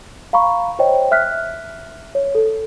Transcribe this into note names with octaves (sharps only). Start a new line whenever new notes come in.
F5 A#5 B5 C#6
C5 C#5 D#5 G5
E5 F6 F#6 B6
C#5
A4